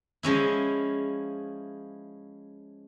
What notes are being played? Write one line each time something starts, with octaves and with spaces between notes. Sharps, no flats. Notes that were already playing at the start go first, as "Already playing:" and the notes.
F3 G#3 C#4 E4